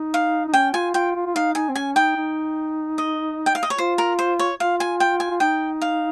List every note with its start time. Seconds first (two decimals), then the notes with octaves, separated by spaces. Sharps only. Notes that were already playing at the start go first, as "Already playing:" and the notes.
Already playing: D#4
0.14 F5
0.48 D#4
0.54 C#4 G5
0.74 F4 G#5
0.94 F4 G5
1.16 F4
1.26 F4
1.35 D#4 F5
1.55 D#4 G#5
1.69 C4
1.75 C#4 G#5
1.95 D#4 G5
2.16 D#4
2.98 D#5
3.46 G5
3.55 F5
3.63 D#5
3.70 C#5
3.78 F4 C5
3.98 A#4
4.19 C5
4.39 C#5
4.60 F4 F5
4.80 G#5
5.00 G5
5.20 G#5
5.31 F4
5.40 D#4 G5
5.81 F5